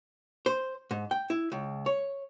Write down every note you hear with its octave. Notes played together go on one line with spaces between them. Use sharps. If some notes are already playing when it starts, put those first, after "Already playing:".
C5
G#2
G5
E4
C#2
C#5